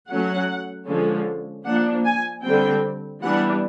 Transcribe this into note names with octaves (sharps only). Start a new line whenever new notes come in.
F#3 A3 C#4 F#5
D3 F3 G#3 C#4
F3 A#3 D4 F#5
G#5
D3 G3 C4 G5
E3 G3 B3 D4 F#5